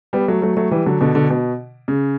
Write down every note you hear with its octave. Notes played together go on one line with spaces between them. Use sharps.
G3 B3
F#3 A3
F#3 A3
F#3 A3
E3 G3
D3 F#3
B2 D3
B2 D3
B2
C#3